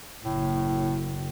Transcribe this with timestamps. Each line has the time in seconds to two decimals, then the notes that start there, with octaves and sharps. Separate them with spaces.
0.24 F#1 A2